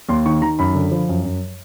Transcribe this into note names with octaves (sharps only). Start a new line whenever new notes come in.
D#2 C6
D#3 C#6
D#3 A#5
F#2 B5
D3
F3
F#2
F#2